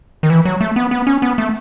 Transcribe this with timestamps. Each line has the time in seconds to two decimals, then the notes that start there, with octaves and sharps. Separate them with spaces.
0.23 D#3
0.30 E3
0.45 F#3
0.61 A3
0.76 B3
0.91 B3
1.07 C#4
1.22 B3
1.38 A3